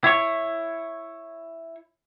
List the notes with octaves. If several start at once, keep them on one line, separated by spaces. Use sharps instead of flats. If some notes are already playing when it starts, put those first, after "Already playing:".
E4 C#5